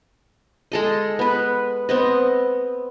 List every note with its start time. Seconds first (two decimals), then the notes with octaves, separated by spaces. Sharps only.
0.72 G#3 A4 D#5
1.19 B3 B4
1.89 B3 C4 D#5